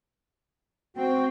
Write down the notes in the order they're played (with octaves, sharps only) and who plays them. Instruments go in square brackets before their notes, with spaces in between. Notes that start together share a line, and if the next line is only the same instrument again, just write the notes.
[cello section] C4 [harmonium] F#4 G5